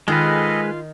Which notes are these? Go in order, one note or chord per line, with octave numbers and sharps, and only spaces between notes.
D#3 G#3 F4 G#4 A4 B4 D#5